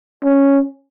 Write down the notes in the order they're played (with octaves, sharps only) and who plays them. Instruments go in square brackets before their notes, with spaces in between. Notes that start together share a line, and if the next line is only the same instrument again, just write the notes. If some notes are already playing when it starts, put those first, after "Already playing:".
[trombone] C#4